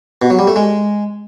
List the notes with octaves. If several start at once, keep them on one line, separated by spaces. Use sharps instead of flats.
B2
F#3
G3
A3
G#3